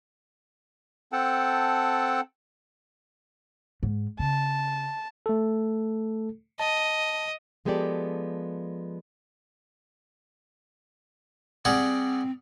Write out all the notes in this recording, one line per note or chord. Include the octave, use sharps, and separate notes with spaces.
C4 A4 F#5 G5 A5
G#2
C#3 A5
A3 A4
D#5 A5
F3 G#3 B3 G4 A4 D5
G3 C4 G#4 F#5